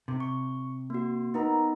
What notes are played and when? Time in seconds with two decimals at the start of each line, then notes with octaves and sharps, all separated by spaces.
0.08 C3
0.20 C#6
0.90 A#3 F#4
1.34 B3 D#4 A#4